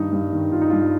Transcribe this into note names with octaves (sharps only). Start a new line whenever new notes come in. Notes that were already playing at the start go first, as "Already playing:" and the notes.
Already playing: G2 D#3 D#4
G2
D#3
D#3 F4
D#4
G2 F4